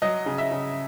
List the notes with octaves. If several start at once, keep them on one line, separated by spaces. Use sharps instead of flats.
F#3 D#5
C#3
E5
C#3